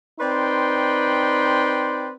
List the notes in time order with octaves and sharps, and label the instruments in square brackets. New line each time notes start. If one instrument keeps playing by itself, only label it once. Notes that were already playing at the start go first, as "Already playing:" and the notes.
[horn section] C4 D#4 B4 D5 G5 C6